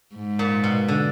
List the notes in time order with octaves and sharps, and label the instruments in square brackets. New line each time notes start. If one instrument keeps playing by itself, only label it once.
[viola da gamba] G#2
[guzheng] A#2
B2
D3